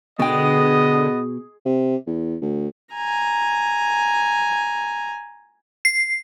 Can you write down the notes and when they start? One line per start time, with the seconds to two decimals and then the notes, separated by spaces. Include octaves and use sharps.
0.20 B2 D3 G#3 B3 D#5 G5
1.66 C3
2.07 E2
2.42 D2
2.93 G#5 A#5
5.85 C7